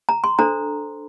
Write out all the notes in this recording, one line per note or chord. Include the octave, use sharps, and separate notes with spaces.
A#5
C6
D4 A4 C5 A#5